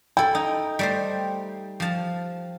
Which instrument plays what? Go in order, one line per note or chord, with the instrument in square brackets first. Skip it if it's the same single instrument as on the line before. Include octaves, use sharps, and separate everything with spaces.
[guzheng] E4 A4 [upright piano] G5
[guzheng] D#4
G3 A3 C5
F3 A5